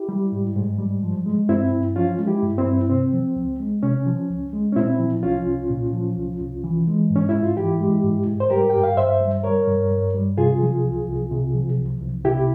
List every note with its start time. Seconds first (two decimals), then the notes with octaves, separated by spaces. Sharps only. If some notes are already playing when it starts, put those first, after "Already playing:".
Already playing: E4 G4
0.09 G3
0.32 G#2
0.56 G#2
0.79 G3
1.03 F3
1.26 G#3
1.49 G2 C4 E4
1.72 G2
1.96 F3 C#4 F4
2.19 G#3
2.27 E4 G4
2.43 G2
2.58 C4 E4
2.66 G2
2.90 C3 C4
3.13 F3
3.36 C#2
3.60 G#3
3.83 C3 C#4
4.06 F3
4.30 C#2
4.53 G#3
4.72 C#4
4.76 A#2 C4 E4
4.99 F3
5.23 C2 C#4 F4
5.46 C2
5.70 A#2
5.93 F3
6.17 C2
6.41 C2
6.64 E3
6.87 G#3
7.10 G#2
7.16 C#4
7.29 E4
7.34 G#2
7.43 F4
7.57 E3 E4 G4
7.80 G#3
8.04 G#2
8.27 G#2
8.40 C5
8.50 G3 G4 A#4
8.70 G2 G5
8.84 F5
8.97 G2 C5 E5
9.21 G3
9.44 G3 A#4 C#5
9.68 G2
9.91 G2
10.14 G3
10.37 C3 F4 G#4
10.61 F3
10.85 C2
11.08 C2
11.31 C3
11.55 F3
11.78 C2
12.01 C2
12.25 C3 E4 G4